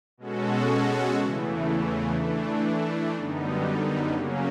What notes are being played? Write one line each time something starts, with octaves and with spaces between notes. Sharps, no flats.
B2 G#3 C#4 F#4 A4
E2 C#3 E3 A3
E3 A3 D4
F#2 D3 G3 B3 D#4
C#3 F#3 A#3 C#4